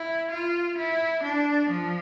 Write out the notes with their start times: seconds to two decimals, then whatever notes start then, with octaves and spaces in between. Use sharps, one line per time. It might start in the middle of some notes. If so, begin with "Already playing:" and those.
Already playing: E4
0.30 F4
0.77 E4
1.23 D4
1.70 F3